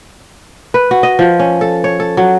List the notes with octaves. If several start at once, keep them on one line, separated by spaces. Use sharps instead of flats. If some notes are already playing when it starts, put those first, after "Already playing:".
B4
F#4
D#5
F3
C#4
A4
C#5
A4
F#3